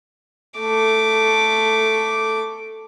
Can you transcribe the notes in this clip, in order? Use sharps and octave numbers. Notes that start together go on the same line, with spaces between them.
A3 D6